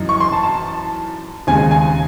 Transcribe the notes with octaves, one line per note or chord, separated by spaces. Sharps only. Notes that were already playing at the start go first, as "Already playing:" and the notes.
Already playing: F#2 E3 D#4
C#6
C6
A5
A5
D#2 C#3 G#3 G#5
G#5